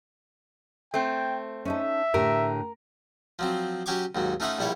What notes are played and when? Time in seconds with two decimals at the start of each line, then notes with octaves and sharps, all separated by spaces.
0.94 A3 C4 G5
1.65 C#4 D#4 A4 E5
2.14 A2 D3 G4 A#4
3.39 F3 F#3 C4
3.86 F#3 C#4 G4 C#5 C#6 D6
4.15 D#2 G#2 F#3
4.40 A3 C#4 D#4 F4 E5 F#5
4.59 A#1 G3 E4 A4 C#5